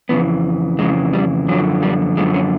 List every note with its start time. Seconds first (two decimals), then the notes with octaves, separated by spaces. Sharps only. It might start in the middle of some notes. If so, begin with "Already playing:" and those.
0.09 F2 C#3 E3 B3
0.79 F2 C#3 E3 G#3
1.13 G3
1.48 F#2 D3 F3 F#3
1.83 G3
2.17 F#2 D3 F3 G#3
2.34 C#4